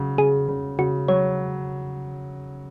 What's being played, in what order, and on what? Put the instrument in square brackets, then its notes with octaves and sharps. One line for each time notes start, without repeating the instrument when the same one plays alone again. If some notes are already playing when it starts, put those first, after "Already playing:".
Already playing: [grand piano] C#3 F#3
[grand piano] C#3 [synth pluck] G#4
[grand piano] C#3
[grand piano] C#3 [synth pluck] F#4
[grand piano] F#3 [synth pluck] C#5